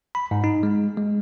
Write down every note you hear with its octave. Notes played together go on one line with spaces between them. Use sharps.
B5
G#2
D#4
G#3
G#3